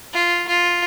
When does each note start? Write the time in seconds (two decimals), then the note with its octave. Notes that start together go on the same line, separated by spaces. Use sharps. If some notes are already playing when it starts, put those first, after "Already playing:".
0.13 F4
0.47 F4